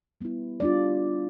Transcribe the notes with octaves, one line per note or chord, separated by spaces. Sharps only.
G3 B3 E4
G3 D4 F4 D5